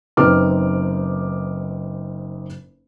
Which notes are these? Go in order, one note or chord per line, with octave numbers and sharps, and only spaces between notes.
F#1 C4 D#4 B4 D6 F6